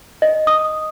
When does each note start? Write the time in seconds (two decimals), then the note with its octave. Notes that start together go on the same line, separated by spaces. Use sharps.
0.22 D#5
0.47 D#6